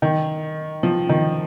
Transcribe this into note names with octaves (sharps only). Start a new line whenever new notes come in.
D#3
F3
D#3